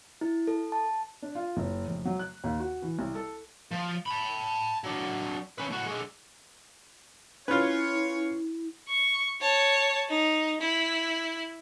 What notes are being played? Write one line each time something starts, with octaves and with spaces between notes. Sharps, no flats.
E4
A4
A5
D4
F4
F#1
F1
F#3
F#6
D#2
F#4
E3
C2
A4
F3
A5 B5
F#3 D4
C#4 B4
A2 F#4
D3 G#3
C#4 E4 F4 B4 C#5 G#5
C#6
C#5 A5
D#4
E4